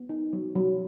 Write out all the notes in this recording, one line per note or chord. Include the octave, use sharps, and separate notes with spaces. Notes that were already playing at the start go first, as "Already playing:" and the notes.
Already playing: B3
D#4
F#3
F#3